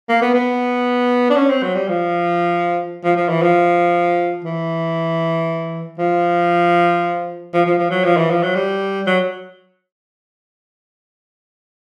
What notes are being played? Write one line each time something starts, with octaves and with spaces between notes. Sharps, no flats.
A#3
B3
B3
D4
C#4
C4
F#3
G3
F3
F3
F3
E3
F3
E3
F3
F3
F3
F3
F#3
F3
E3
F3
F#3
G3
F#3